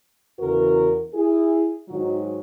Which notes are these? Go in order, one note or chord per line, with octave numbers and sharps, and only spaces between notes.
E2 C#3 E3 F#4 A#4
E4 G#4
G#2 D#3 F#3 D#4 F#4